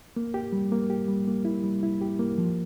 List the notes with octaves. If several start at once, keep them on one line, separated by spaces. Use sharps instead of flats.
A#3
G4
G3
A#3
G4
G3
A#3
E4
G3
E4
G4
A#3
F3